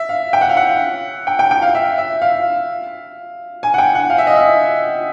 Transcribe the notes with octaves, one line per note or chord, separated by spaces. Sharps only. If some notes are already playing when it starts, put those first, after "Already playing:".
Already playing: E5
F5
G5
F#5
F5
F#5
G5
G5
G5
F5
E5
E5
F5
G#5
F#5
G5
F#5
F5
E5
D#5
E5